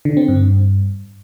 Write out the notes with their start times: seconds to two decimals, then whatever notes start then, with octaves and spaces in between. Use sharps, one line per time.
0.05 D3
0.17 C4
0.28 G2